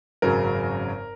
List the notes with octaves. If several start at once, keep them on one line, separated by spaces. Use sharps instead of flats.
G#1 F#2 C#3 F#3 A#4